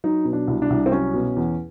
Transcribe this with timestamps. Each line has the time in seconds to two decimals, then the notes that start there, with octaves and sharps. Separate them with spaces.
0.04 F#3 D#4
0.25 B2
0.33 D4
0.48 C2
0.62 D4
0.70 C2
0.86 C4
0.92 F#3 C#4
1.14 B2
1.36 E2